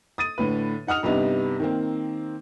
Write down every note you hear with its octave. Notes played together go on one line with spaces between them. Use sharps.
D#6 A6 D#7
A2 D3 B4
D#4 F#5 D#6 F6 F7
G2 C3 G3 B3 D#4
D#3 A#3 C4